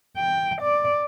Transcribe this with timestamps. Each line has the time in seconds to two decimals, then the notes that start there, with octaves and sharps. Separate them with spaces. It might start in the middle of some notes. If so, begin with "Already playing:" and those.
0.17 G5
0.61 D5